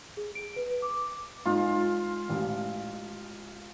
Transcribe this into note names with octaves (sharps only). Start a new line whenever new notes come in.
G#4
D7
B4
D6
G#2 G#3 F4
A1